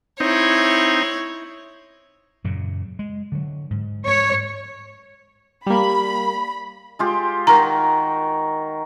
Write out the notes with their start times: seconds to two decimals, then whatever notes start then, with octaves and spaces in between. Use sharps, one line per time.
0.20 C4 D#4 E4 C#5
2.44 F#2 A#2 C#3
2.99 G#3
3.32 D3 F#3
3.71 G#2
4.06 C#5
5.67 G3 A#3 B5
6.99 G#3 F4 G4
7.47 D#3 F#4 A#4 A#5